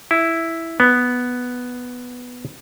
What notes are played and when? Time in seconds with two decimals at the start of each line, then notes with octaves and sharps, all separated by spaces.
0.11 E4
0.80 B3